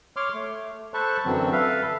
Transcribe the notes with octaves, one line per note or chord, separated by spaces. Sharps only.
C#5 C6 D6 F6
A3
A4 C5 A5 B5 C#6 F#6
F#2 D3 E3 F#3 C4
A4 B4 E5 F5